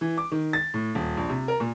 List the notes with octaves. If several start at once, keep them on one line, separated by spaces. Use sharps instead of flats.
E3
D6
D#3
A6
A2
D#1
A#1
C3
A#4
A#2